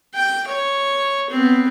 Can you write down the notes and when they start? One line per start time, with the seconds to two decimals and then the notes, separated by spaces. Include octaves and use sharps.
0.14 G5
0.47 C#5
1.30 B3 C4